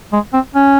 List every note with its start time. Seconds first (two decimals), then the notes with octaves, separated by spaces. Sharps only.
0.13 G#3
0.33 C4
0.55 C#4